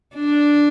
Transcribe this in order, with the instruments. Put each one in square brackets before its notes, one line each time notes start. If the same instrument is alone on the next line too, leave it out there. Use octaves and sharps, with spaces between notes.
[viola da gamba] D4